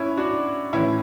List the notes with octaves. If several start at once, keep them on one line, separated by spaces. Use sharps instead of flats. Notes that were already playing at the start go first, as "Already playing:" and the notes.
Already playing: G#2 C#4 E4
D4 F#4
A2 E3 C#4 E4